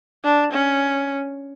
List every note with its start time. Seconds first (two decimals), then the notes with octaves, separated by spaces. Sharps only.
0.24 D4
0.52 C#4